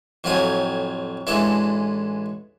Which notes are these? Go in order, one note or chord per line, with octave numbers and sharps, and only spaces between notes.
F2 A2 F#3 F4 G4 G#5
A1 E3 G#3 D4 A4 E5